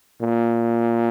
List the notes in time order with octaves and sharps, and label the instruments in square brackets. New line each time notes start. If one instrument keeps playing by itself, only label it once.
[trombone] A#2